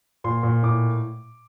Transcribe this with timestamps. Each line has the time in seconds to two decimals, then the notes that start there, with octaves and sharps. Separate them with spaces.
0.24 A#2 C6
0.43 A#2
0.63 A2 D6